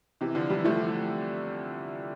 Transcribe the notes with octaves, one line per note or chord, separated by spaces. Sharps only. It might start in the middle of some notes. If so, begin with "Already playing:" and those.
C3 E3
D3 F3
E3 G3
F3 A3